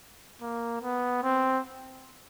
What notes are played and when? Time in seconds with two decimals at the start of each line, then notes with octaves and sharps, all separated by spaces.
0.41 A#3
0.82 B3
1.23 C4